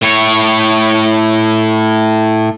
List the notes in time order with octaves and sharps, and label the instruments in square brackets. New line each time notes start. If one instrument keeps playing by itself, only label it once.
[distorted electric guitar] A2 C#5